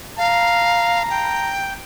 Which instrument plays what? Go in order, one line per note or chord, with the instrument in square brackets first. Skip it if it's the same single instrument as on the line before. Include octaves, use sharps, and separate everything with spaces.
[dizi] F5 [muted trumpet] A#5
[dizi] G5